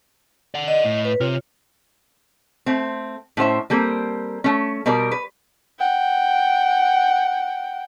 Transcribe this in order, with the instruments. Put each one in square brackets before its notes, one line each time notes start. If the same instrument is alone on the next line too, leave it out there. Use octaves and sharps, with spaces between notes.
[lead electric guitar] D5 F#5
[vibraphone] D#5
[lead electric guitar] A2
[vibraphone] B4
[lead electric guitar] C3 [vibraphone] F4 C#5
[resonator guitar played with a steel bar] A3 C4
A2 C#4 C5 E5
G3 A#3 C4 A4
A3 C#4
B2 G3 A#4 D5
B4
[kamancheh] F#5 G5